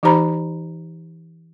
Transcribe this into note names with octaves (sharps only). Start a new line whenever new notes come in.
E3 D#4 G4 C5 A#5 B5